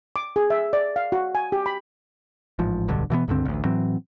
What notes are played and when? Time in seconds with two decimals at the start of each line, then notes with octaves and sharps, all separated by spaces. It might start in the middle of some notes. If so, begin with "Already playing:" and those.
0.16 D6
0.36 G#4
0.50 E5
0.73 D5
0.96 F5
1.12 F#4
1.35 G#5
1.52 G4
1.66 B5
2.59 A1 G#2 F3
2.88 D1 B1 G2 D3
3.10 B2 E3 F3 B3
3.28 C#2 G2 D3 C4
3.45 A1 D2
3.65 A2 E3 F#3 C4